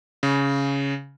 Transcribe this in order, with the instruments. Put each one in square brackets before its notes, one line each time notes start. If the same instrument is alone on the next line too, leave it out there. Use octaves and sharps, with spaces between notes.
[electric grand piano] C#3